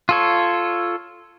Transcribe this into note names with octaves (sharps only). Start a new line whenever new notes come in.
F4 A4 C#5